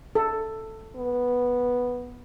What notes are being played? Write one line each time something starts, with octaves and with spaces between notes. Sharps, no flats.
A4
B3